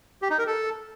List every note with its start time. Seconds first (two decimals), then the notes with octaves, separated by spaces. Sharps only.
0.22 G4
0.30 D#4
0.38 A#4
0.47 A4